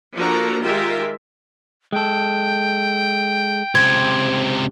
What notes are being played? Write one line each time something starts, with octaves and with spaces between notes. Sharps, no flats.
F3 A#3 D4 F#4 A4 A#5
D#3 G#3 F4 G4 A#4 E5
G#3 A4 G5
C#2 C3 C5 G#6